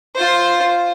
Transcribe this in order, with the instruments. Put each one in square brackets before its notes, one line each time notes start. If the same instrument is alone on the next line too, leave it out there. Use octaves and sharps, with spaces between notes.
[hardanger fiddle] F4 C5